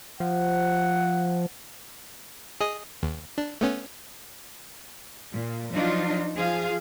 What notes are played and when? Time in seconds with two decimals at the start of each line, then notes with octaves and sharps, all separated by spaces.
0.20 F3 F#5
2.61 G#4 D#5 D#6
3.03 D#2
3.38 D4
3.61 A3 B3 C#4
5.32 A#2
5.73 F3 F#3 D4 D#4 F4
6.35 F3 F4 G#4 F5